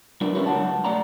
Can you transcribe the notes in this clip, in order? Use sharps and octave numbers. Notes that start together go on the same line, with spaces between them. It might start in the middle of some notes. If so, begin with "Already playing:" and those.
F#3 G3 B3 D4 F4 A#4
C#4 E4 F#4 A#4 B4 C#5
C#2 F#3 F#5 A5
A3 D5 F#5 A#5